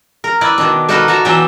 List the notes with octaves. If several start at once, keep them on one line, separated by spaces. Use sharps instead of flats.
A#4
E4 B4 D5
B2 D#3 D4
A3 D4 D#4 F#4 A#4 B4
F#4 A5 A#5
B2 E3 F#3 D4 E5 G5